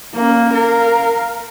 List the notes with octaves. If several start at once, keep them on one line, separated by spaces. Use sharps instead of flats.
A#3 C#4
A#4 F5